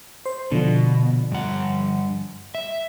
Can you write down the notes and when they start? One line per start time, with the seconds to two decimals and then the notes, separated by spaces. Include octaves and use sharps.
0.26 C5
0.51 B2 D3 F3
1.32 G2 F#5
2.55 E5